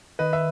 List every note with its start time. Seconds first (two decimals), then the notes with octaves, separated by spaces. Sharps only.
0.19 D#3 B4 D#5
0.33 E5